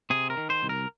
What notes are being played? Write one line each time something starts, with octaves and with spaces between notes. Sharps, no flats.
C3 G#4
A#4
D#3
C5
C2
A#4